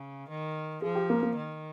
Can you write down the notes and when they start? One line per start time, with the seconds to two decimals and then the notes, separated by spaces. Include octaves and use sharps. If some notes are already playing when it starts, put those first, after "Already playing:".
Already playing: C#3
0.29 D#3
0.82 F3 G#4
0.95 G4
1.10 A#3
1.23 A#3
1.36 D#3